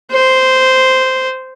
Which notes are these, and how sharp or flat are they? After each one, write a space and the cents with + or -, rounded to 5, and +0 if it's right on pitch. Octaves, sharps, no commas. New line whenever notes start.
C5 -10